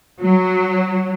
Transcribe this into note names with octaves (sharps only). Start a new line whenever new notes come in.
F#3